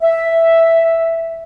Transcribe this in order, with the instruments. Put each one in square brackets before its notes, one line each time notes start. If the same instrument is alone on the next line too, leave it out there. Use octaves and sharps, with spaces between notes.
[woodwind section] E5